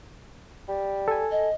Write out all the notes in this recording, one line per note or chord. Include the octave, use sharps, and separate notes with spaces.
G3
A4 G#5
D#5